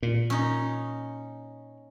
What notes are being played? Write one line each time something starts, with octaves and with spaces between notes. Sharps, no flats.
A#2
C#4 D#4